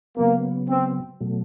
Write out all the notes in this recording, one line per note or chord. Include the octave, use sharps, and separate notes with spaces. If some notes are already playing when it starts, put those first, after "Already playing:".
C#3 F#3 A#3 B3
C4
B2 F#3 A3